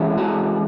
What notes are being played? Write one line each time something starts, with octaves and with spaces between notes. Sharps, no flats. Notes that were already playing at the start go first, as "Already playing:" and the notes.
Already playing: E3 G#3 C#4 E4
F#4